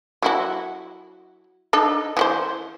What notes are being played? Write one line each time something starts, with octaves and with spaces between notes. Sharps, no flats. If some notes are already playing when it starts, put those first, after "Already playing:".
F#3 E4 F#4
D4 D#4 A4
E3 F#4 C5